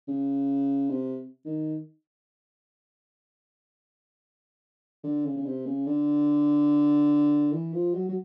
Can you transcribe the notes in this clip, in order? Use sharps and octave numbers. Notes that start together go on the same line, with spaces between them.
C#3
C3
D#3
D3
C#3
C#3
C3
C#3
D3
E3
F3
F#3
F#3